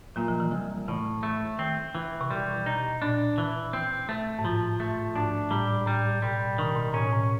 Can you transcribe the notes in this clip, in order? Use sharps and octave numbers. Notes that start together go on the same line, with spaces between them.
A#2 F#3
F3
E3
C2 F3
A2 E3
A3
D#3 C4
E3
C3
B2 G3
D#4
A#2 D4
E3
C4
A3
G#2
A2 F3
A3
G#2 D4
A2 G3
A2 G3
B2 G3
C3 D#3
B2
A2 C#4
A2